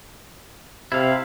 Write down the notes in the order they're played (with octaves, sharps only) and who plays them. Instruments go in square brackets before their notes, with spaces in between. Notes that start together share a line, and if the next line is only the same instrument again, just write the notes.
[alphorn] C3 [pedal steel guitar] E4 F5